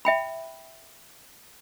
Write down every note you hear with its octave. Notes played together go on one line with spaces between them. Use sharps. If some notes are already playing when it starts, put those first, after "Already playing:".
E5 G5 B5